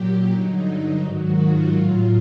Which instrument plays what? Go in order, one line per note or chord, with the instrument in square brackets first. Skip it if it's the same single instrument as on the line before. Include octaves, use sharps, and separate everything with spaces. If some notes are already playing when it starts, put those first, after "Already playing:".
Already playing: [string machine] A#2 F#3 G4
G2 D3 F#3 D#4
D#4
G#2 D#3 F#3 F#4
F4
A2 F#3